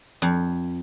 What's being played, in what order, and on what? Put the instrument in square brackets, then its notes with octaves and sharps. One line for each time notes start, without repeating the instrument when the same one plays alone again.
[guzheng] F2